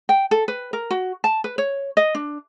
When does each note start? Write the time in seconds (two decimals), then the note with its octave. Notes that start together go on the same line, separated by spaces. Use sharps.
0.09 G5
0.31 A4
0.48 B4
0.73 A#4
0.91 F#4
1.24 A5
1.44 B4
1.58 C#5
1.97 D#5
2.15 D4